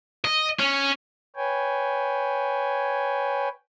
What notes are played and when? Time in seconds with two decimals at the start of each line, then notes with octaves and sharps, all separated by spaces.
0.25 D#5
0.59 C#4
1.36 B4 C#5 G5 G#5